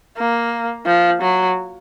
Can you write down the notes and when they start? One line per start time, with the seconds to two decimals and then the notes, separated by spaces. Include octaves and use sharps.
0.18 A#3
0.86 F3
1.22 F#3